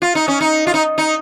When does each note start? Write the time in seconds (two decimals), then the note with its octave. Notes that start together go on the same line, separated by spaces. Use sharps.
0.02 F4
0.15 D#4
0.28 C#4
0.41 D#4
0.67 F4
0.74 D#4
0.98 D#4